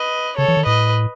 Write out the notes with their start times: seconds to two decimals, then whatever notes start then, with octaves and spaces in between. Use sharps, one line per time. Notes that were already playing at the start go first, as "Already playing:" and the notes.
Already playing: B4 D#5
0.38 C#3 A4 C#5
0.48 E3
0.57 D#3
0.66 A2 B4 D#5